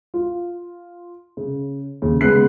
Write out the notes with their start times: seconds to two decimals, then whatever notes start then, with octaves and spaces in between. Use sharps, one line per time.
0.14 F4
1.37 C#3
2.02 D#2 C#3
2.21 C#3 G#3 B3 G#4 F#6 C7